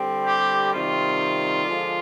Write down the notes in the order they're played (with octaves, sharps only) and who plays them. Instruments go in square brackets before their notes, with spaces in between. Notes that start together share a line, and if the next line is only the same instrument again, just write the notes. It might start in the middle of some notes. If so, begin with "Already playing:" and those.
Already playing: [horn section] D3 G3 C4
G4
C3 D#3 G3 F4
D3 F3 G#3